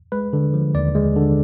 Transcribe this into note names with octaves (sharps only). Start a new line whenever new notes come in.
G#3 B4
D3
F3
D#2 D5
G#3
D3